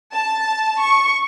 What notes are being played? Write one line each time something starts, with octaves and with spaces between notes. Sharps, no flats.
A5
C#6